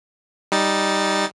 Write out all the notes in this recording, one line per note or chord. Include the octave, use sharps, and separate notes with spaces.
G3 D#4 A6